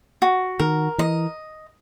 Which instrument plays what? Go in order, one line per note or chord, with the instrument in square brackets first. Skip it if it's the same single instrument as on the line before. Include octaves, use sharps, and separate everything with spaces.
[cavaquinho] F#4
[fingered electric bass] D#3 [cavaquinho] A#4
[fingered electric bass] E3 [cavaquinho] D#5